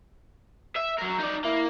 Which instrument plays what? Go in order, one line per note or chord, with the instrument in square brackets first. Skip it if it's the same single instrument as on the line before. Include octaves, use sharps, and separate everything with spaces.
[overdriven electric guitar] E5
F#3 A#4
D#4 D5
[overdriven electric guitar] A#3 [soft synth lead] E4